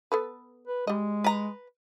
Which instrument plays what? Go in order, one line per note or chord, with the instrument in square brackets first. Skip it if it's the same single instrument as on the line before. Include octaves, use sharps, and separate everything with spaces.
[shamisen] B3 A4 B4
[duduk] B4
[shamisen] G3 D#5 [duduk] G#3
[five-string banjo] B4 A#5